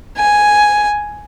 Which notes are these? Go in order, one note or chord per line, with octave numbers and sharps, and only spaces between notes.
G#5